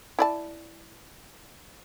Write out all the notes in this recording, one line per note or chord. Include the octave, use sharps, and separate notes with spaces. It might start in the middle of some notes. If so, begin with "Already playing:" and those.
E4 D5 A5